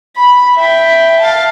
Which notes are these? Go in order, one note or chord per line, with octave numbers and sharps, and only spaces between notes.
B5
E5 G5
F5 A5